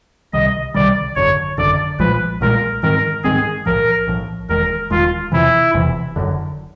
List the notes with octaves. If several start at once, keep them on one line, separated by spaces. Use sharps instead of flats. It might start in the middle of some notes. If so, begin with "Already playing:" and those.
C2 C3 D#3 G3 D#5
C2 C3 D#3 G3 D5
G#1 F#2 D3 C#5
G#1 F#2 D3 D5
B1 A#2 F3 G#3 B4
B1 A#2 F3 G#3 A#4
G#2 D#3 G#3 C4 A#4
G#2 D#3 G#3 C4 G#4
B1 A2 F3 A#4
B1 A2 F3
E1 D#2 D#3 G#3 A#4
E1 D#2 D#3 G#3 F4
F1 E2 C3 E3 E4
F1 E2 C3 E3
F#1 F#2 D3